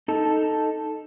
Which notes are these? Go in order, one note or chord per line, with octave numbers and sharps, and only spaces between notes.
D#4 A4